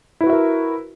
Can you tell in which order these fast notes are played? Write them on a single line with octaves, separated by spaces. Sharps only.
E4 B4 F#4 E5 A#4